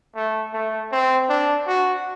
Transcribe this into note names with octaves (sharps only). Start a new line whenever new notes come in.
A3
A3
C4
D4
F#4